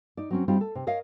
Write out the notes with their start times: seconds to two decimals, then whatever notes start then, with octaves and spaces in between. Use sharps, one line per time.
0.17 D#4 D5
0.31 F#3 C4 C#4
0.48 G3 C4 D#4 F4
0.61 A4
0.75 C3
0.87 A#4 C#5 D#5 F5